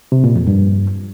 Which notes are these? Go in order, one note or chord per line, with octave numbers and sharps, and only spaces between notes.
C3
A#2
F2
G2